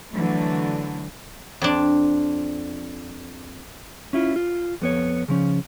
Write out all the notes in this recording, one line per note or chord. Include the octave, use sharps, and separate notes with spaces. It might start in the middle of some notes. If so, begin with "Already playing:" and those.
D3 E3 F#3 A3
F2 D4
C#4 E4 F4
F4
F2 B3 C#5
C#3 F3 C#4